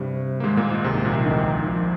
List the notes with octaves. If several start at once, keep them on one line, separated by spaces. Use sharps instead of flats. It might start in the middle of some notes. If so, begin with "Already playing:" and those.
Already playing: G2 C3 G3
A#3
G#2 D#3 G#3
A#2 A#3
G#2 G#3
C2 C3
G#2
A#1 A#2
C2 C3
D2 D3 D#3
F3